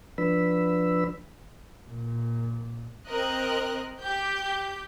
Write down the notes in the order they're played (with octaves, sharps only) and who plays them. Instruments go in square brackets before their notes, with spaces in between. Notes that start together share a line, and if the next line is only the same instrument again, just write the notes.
[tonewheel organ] F3 D4 B4 B5 E6
[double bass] A#2
[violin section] C4 A#4 D#5 F#6
G4 G6